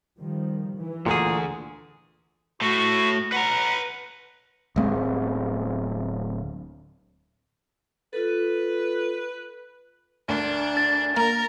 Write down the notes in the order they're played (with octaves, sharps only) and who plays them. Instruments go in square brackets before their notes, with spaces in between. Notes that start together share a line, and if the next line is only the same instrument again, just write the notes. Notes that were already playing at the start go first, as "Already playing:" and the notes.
[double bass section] D#3 F3 G3
E3
[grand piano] D2 D3 [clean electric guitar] A#2 G#4
[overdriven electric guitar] A2 A3 [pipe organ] F#4
[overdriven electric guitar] B4 A#5 [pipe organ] F#5
[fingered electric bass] D1 G#3 C4
[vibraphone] F4 A4 [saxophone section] B4
[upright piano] D2 A#4 G7 [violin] D4
[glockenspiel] A6
[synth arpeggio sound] A#3 F5 [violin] A#4 [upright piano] A#5